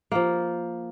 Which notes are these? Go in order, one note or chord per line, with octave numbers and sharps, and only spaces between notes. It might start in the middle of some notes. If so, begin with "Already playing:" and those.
F3 A#3